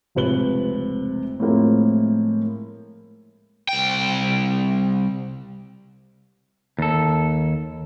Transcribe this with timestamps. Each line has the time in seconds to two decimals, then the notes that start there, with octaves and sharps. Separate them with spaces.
0.15 F1 C#2 C3 B4 F#7 G7
1.40 A2 F3 G#3 A#3 C4 E4
3.69 C2 G5
6.79 D#2 A4